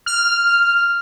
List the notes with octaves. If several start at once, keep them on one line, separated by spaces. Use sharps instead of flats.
F6